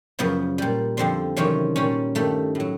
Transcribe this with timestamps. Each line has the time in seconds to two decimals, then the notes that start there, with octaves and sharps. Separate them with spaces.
0.19 F#2 C#3 F3 B3
0.58 A#2 G3
0.97 F2 D3 G3 C4
1.36 E2 C3 D#3 F#3 C#4
1.76 A#2 G3 C#4
2.15 G2 D#3 G3 A3
2.55 A2 F#3